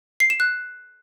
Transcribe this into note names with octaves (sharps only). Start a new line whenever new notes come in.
C7
E7
F#6